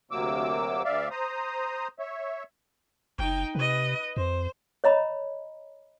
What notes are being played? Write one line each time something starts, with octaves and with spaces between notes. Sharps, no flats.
D2 C3 F#3 A#3 D6 E6
D2 D5 E5 F5
C5 A#5 D#6
C#5 E5
F#1 D#4 G5
C3 B4 D#5
F2 C5
C#5 D#5 A#5 B5